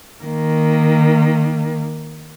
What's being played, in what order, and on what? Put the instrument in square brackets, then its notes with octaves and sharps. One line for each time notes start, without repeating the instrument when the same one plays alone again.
[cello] D#3 A#3